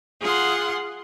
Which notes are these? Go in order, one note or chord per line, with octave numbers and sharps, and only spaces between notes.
F4 G#4 F#5 C6